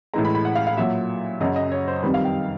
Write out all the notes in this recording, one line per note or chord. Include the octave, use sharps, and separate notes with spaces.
A2 E3 G#3 A#5
B5
B5
F#5
F5
F5
A#2 F#3 E5
F#2 C#3 F#3 D#5
D#5
C#5
C5
F2 C3 D#3 G3 B4
F5
G5